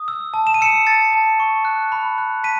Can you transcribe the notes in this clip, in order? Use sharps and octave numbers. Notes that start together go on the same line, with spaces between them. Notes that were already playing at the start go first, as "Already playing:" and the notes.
Already playing: D#6
E6
A5
E7
D#7
E6 C#7 E7
A5 A6 C#7
A5
C#6
F#6
B5
F#6
A5 B6 D#7